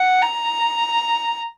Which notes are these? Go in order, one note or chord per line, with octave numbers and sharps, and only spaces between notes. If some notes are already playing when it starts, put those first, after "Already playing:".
Already playing: F#5
A#5